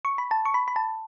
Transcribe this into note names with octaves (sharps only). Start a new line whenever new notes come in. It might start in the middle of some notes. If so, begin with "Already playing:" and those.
C#6
B5
A5
C#6
B5
B5
A5